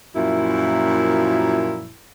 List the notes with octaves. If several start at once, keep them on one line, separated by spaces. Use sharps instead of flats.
F#2 A#2 F3 E4